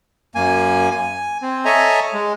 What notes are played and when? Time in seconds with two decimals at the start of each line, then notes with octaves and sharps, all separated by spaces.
0.35 F#2 A#3 G#5
0.91 G#5
1.42 C4
1.65 A4 C#5 D#5 E5 G#5 A#5
2.14 G#3